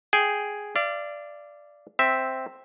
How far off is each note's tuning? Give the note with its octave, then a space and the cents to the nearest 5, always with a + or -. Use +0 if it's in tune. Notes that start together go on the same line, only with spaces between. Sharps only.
G#4 +0 G5 +0
D5 +0 F5 -35
C4 +0 E5 -5